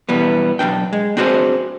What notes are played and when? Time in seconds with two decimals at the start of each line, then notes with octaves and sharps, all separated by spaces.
0.09 B2 E3 G3 B3
0.59 B1 E2 D4 G5
0.93 G#3
1.17 C4 D4 F#4 G#4 C5